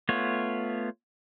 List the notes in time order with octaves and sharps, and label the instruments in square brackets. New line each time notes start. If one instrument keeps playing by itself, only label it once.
[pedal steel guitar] A3 B3 F4 C#5